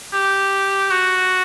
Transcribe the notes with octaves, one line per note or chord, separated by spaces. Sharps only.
G4
F#4